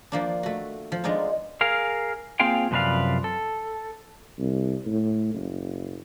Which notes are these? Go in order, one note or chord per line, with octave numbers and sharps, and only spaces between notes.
F3 A#3 D4
A3 F#4
F3
G#3 B3 D4 D#4 F4
G#4 A#4 F5
A#3 C4 F4 G#4 F5 G5
F#2 C3 F3 B4 D5 F5
A4
C2
A2
F#1